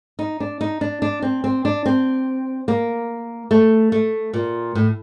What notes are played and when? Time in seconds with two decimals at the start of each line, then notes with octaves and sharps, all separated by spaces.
0.19 D#4
0.40 D4
0.61 D#4
0.81 D4
1.02 D4
1.22 C4
1.44 C4
1.65 D4
1.86 C4
2.68 A#3
3.51 A3
3.92 A3
4.34 A#2
4.75 A2